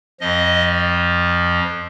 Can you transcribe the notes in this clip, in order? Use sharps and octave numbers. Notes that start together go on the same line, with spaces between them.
F2 F3 D#5